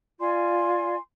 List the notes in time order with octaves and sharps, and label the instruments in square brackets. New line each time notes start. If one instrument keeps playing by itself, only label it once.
[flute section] F4 D5 G#5 C6